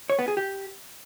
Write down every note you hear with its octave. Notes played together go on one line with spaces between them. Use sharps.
C#5
B3
G#4
G4